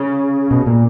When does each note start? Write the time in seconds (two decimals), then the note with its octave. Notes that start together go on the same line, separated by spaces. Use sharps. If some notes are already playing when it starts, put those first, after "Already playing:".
Already playing: C#3
0.51 B2
0.66 A#2